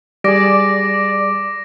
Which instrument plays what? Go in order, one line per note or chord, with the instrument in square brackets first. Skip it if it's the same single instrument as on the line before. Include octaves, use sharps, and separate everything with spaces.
[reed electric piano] G3 G#4 [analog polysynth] D5 [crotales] D6 A#6 D7